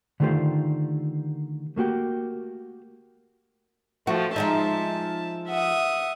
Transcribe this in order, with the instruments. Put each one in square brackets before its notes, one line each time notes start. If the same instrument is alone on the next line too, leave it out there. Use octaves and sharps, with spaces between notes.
[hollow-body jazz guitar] D3 D#3 A3 F4 G4 C5
A3 A#3 F#4 G4
[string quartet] F3 A3 [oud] F#4
[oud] F3 G#3 D#4 [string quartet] E5 A5
[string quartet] E5 F#5 D#6